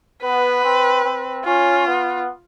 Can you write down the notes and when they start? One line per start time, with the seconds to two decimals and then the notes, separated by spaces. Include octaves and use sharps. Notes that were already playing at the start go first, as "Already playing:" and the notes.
0.23 B3 B4
0.63 C4
1.04 C4
1.45 C#4 F4
1.86 B3